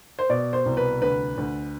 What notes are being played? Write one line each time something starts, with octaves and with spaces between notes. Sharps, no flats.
C5
B2 D5
C5
C2
B4
D2 B4
D2